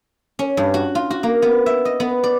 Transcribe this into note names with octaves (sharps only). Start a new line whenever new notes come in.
C#4
G2
F#4
F4
F#4
A#3
B3
E5
D#5
B3
D5